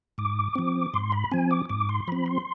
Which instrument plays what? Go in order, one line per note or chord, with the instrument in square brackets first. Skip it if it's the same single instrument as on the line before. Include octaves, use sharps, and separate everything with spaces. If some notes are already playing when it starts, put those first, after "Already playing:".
[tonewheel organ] G#2 D6
F3 C4
G#2 C6
B5
F3 C4 G#5
D6
G#2 D6
C6
F3 C4 B5
C6